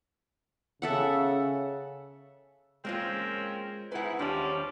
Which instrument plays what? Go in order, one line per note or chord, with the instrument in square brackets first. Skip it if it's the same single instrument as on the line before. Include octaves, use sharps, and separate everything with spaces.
[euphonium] C#3 [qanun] A4 E5 F#5
[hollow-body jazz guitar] G#3 A#3 F4 [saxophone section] C4 C#4 A#4
[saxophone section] G#2 E4 [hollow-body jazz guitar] B4 F#5
[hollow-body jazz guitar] D#2 D4 [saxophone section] F3 G3 C#4